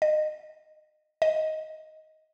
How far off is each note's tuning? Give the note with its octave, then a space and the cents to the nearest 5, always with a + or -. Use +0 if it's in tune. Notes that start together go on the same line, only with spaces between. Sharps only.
D#5 -20
D#5 +10